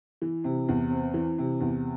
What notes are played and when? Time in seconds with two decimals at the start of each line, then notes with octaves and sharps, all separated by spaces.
0.22 E3
0.44 C3
0.68 E2
0.91 C4
1.14 E3
1.38 C3
1.60 E2